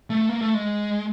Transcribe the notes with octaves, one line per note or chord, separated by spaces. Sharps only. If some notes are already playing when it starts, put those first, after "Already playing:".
A3
A#3
A3
G#3